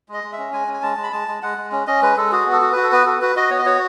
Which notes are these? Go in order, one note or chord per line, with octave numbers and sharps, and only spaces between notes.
G#3 D#5
G#3
E5
C#4
G#3 G#5
C#4
G#5
G#3 A5
G#3
B5
G#3 A5
G#3
G#3 F#5
G#3
C#4
C#4 D#5
G#3 B4
G#3 A4
F#4 G#4
B3
A4
F#4
F#4 B4
A4
B3 B4
F#4 A4
F#4 B4
F#4 D#5
B3 C#5
D#5
F#4 C#5